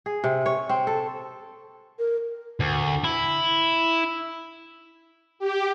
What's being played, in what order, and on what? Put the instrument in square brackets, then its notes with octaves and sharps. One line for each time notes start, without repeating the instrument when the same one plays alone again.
[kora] G#4
C3
C#5
C4
A4
[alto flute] A#4
[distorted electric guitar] D2
E4
[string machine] G4